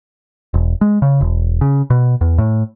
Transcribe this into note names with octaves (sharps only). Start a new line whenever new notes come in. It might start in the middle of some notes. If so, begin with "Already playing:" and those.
E1
G#3
C#3
E1
C#3
B2
E2
A2